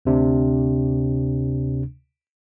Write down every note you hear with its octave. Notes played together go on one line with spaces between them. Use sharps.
D2 C3 D4